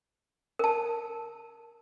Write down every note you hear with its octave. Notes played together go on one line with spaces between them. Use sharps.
A#4 A5